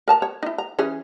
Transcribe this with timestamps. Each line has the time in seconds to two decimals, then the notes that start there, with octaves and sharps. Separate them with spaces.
0.08 A#4 A5 A#5
0.22 C#5
0.43 D#4 E4
0.58 A#5
0.79 E3 C#4 G#4